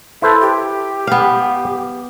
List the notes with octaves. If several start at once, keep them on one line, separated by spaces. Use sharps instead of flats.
E4 A4 B4 C5
G4
B3 F5